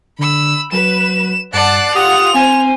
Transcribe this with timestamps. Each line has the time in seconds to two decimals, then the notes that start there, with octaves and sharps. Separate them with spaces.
0.19 D3 B5 E6
0.72 F#3 B4 E7
1.53 G2 D5 F#5 A5 F#6 C7
1.95 F4 G4 F#5 D#6 F7
2.34 C4 C5 G#5